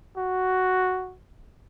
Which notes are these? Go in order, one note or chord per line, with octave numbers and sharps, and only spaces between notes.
F#4